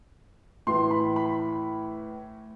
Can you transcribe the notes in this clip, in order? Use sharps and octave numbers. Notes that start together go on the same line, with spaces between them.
A2 E3 C6
B5
B5